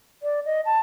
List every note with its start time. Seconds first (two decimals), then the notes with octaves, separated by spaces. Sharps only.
0.23 D5
0.45 D#5
0.65 A5